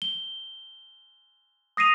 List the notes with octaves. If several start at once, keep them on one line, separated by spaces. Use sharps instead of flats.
G7
D#6 A#6 C7 D#7 F7